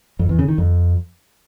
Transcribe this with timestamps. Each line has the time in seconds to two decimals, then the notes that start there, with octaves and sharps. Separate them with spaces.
0.19 F2
0.29 E2
0.39 C#3
0.48 D#3
0.58 F2